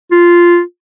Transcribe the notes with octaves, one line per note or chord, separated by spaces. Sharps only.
F4